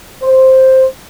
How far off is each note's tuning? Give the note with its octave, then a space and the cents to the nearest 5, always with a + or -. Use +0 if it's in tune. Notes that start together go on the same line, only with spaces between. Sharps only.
C5 +5